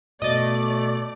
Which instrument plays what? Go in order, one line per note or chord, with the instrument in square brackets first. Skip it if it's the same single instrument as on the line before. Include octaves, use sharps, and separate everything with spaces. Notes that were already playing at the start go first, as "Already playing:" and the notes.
[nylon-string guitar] B2 [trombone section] A3 [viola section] D5 [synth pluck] D#5 A6